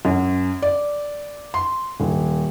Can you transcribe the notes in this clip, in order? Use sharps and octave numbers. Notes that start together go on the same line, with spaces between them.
F#2
D5
C6
D#1